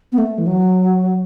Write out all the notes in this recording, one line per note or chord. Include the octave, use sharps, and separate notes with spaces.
B3
A3
E3
F#3